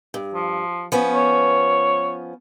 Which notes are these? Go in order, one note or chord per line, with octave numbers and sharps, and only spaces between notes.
G2
F3
F3 B3 C#4
C#5